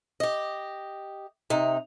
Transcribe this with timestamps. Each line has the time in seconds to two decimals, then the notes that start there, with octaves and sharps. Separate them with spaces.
0.20 G4 D#5
1.50 C3 D#4